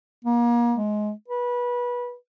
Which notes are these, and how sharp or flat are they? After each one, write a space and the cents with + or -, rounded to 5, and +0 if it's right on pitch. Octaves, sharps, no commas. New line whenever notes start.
A#3 +35
G#3 +20
B4 -20